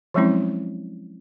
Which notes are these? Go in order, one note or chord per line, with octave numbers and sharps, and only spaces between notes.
F3 F#3 G#3 C4 C#4 E4